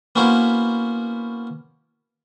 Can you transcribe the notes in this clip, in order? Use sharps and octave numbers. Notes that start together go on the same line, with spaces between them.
A#3 B3 C#4 E4 F#4 C5